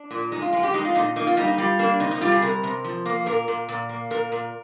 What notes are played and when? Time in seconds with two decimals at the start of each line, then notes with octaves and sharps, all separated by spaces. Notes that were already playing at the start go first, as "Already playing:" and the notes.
Already playing: D4
0.11 A#2
0.32 G#3 D#4
0.42 F4
0.53 G#3 F4
0.63 G4
0.74 G#3 D#4
0.85 F4
0.95 A#2 D#4
1.16 A#3 D#4
1.27 F4
1.37 G3 D#4
1.48 D#4
1.58 G3 F4
1.79 A#3 D4
2.00 C3 D#4
2.11 D#4
2.21 G3 F4
2.32 G#4
2.42 C3 A#4
2.63 C3
2.84 F3
3.06 A#3
3.26 A#2 A#4
3.48 A#2
3.69 A#2
3.89 A#3
4.10 A#2 A#4
4.32 A#2